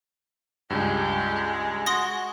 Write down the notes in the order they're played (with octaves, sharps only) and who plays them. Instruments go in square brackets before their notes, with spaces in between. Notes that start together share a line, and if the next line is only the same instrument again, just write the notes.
[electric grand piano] C#2 G2 [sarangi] G#3 [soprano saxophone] G4
[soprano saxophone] F#4 [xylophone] C6 D#6 A#6